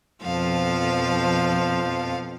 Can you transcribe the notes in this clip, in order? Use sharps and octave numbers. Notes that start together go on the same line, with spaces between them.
F2 B2 F3 A4 F5